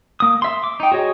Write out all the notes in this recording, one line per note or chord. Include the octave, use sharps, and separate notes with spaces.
A#3 D#6
E5 C6
D6
D#4 G5
F#4 G#4 C#5 D#5